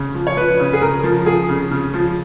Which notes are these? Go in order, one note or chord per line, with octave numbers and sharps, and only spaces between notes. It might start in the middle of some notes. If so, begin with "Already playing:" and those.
Already playing: C#3
F3
C#5
F3 B4
C#3
G#4
C#3 A#4
F3
F3 G#4
C#3
C#3
F3